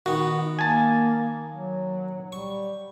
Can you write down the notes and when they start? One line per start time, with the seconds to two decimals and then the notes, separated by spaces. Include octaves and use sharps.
0.06 D#3 B3 F#4
0.59 A#3 G#5 A5
1.52 F#3
2.32 G3 C#6